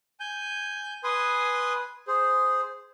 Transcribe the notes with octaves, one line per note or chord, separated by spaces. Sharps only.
G#5 G6
B4 G#5 C6 D#6
G#4 C5